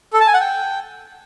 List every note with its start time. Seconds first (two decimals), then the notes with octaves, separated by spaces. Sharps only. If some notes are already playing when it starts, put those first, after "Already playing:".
0.13 A4
0.20 A5
0.27 G#5
0.34 F#5
0.41 G5